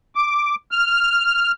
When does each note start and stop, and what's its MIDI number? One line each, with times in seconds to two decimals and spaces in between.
0.15 0.55 86
0.71 1.51 89